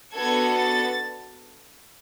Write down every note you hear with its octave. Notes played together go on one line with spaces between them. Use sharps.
B3 D4 F#4 A4 G#6
A6